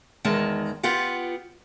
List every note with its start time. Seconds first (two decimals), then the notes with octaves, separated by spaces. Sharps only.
0.25 E2 D#3 G#3 A5
0.83 B3 F4 G4 F#5